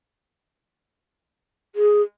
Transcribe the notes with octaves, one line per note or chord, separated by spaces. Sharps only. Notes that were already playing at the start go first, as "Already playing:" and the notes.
G#4